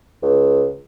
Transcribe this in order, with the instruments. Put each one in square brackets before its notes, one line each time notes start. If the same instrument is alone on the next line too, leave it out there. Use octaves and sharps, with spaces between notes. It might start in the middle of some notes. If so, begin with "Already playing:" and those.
[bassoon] C#2